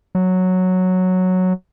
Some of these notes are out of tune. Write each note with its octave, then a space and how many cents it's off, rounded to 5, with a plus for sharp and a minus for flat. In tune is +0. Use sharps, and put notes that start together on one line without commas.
F#3 -5